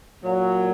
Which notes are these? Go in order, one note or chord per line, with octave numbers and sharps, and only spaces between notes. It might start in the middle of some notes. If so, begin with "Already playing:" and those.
A#2 F#3